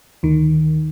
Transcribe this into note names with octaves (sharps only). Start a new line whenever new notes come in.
D2 D#3